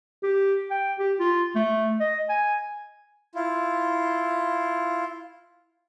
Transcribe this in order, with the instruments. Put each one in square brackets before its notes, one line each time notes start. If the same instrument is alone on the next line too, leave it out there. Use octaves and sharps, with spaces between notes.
[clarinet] G4
G5
G4
F4
A3
D#5
G#5
[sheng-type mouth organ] E4 F4